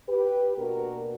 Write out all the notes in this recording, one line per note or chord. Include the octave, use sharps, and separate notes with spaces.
G4 B4
B2 A#3 D4 F#4 A#4